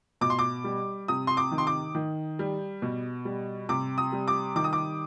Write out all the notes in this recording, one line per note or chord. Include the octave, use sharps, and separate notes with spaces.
B2 D6
C6
D6
G3
C3 D#6
C6
D6
D#3
C6
D6
D#3
G3
B2
G3
C3 D6
D#6
G3
D6
D#3 D6
D#6
D6